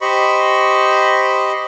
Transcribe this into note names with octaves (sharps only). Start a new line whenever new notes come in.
G4 C5 D#5 B5 C#6